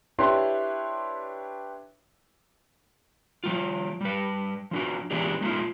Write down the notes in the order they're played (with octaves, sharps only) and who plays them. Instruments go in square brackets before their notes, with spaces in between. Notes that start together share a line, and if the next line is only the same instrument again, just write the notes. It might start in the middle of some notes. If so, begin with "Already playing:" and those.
[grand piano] D4 E4 G4 B4 C#5 C6
[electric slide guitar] F3 G3 F4
G3 B4
F3 D4 F#4
E3 G#3 B3 D4 G4
G#3 A3 C#4 D#4 F4